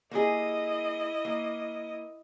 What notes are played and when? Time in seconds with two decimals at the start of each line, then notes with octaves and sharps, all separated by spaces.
0.11 A#3 E4 G#4 D#5
1.25 A#3